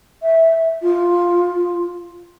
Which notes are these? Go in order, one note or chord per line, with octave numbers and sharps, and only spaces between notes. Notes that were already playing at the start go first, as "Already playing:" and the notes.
E5
F4